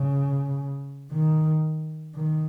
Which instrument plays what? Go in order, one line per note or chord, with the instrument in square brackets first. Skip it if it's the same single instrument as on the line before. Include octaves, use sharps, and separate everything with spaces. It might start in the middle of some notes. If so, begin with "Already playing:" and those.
Already playing: [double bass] C#3
D#3
D#3